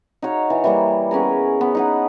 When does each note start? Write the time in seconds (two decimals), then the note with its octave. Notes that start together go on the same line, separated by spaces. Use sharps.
0.22 D#4 F#4 C#5 F5
0.50 E3
0.64 E3 G3 A#3
1.11 B3 C#4 G#4 A#4
1.61 B3
1.75 D#4 B4 F#5